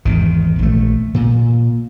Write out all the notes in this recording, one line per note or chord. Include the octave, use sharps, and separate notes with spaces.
G#1 E2 D#3
A#1 A3
A#2